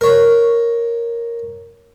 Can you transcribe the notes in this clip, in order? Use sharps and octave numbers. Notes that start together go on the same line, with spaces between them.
A#4 C#5